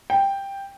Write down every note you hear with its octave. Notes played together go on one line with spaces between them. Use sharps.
G5